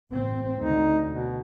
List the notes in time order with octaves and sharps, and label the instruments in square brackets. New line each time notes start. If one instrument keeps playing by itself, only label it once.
[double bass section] A1 C4
[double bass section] D2 D3 [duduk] D#4
[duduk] B2